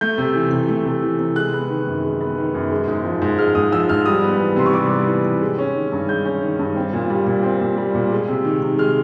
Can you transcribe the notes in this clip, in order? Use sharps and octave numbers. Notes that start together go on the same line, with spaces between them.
A3 G6
C3
E3
C3
A3
C3
E3
C3
G#3 F#6
B3
D#3
F#2
G#3
B3
D#3
F#2
G#3
G#2
F3
G#2
G#3 F6
G#2 D#6
F3 E6
G#2 F6
G3 D#6
B3
E3
C3 C6
C#6
G3 D6
B3
E3
C3
G#3
C#4
D#3
G2
G#3 G6
C#4
D#3
G2
C4
A#2
G3
A#2
C4
A#2
G3
A#2
G#3
C3
D#3
C3
G#3 F6